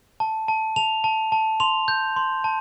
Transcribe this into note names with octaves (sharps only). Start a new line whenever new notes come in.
A5
A5
A5 F7
A5
A5
C6 F7
G6
C6
A5